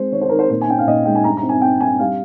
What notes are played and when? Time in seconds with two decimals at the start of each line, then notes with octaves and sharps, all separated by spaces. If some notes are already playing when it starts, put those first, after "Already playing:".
Already playing: G#3 C4 C5
0.12 D#3 C#5
0.22 C5
0.29 D#3 A#4
0.39 C5
0.50 A#2 C5
0.61 G#5
0.68 C#4 G5
0.79 F5
0.87 A#2 D#5
1.05 G#3 G5
1.15 G#5
1.24 G2 A#5
1.37 A#5
1.43 C4
1.49 G#5
1.62 C4 G5
1.80 G2 G#5
1.99 G3 F5